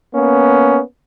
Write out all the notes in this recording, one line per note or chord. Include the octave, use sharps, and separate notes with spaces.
A#3 B3 C#4